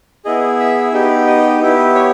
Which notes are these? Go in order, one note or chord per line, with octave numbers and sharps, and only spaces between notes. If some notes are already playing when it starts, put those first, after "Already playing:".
B3 E4 G#4 D#5
E5
B3 D#4 G4
D#5
B3 E4 G4
C#5